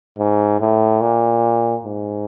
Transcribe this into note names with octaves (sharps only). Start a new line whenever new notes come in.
G#2
A2
A#2
G#2